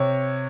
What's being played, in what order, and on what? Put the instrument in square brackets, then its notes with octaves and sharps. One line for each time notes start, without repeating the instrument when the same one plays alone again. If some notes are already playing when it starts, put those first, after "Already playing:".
Already playing: [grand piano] C3 C#5